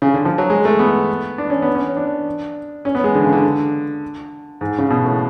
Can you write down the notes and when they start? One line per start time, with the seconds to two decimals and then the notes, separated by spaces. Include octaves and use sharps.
0.02 C#3
0.14 D3
0.25 F3
0.38 F#3
0.50 G#3
0.65 A3
0.79 B3
1.38 D4
1.50 C#4
1.62 B3
1.75 C#4
1.96 D4
2.85 C#4
2.95 B3
3.04 G#3
3.15 D3
3.24 C#3
3.33 D3
4.61 G#2
4.78 C#3
4.90 B2
5.05 A2